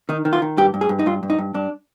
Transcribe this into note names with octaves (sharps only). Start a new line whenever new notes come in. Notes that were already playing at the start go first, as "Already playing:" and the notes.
D#3 D#4
D#3
F4
D#3
G2 G4
G2
G#4
G2
D#4
G2 F4
G2
D#4
G2
G2 D4